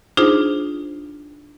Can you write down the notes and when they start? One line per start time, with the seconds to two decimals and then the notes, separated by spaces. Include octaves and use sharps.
0.17 D4 D#4 F4 G#4 C5